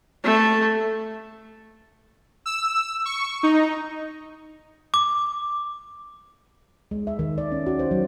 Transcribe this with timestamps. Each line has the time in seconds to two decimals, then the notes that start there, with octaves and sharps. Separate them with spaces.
0.24 A3
2.46 E6
3.05 C#6
3.43 D#4
4.94 D6
6.91 G#3
7.07 E5
7.19 D#3
7.38 D5
7.52 C#4
7.66 F#4
7.79 C5
7.91 F#3